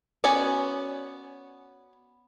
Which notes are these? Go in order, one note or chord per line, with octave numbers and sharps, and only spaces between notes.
B3 C#4 F#4 C#5 D5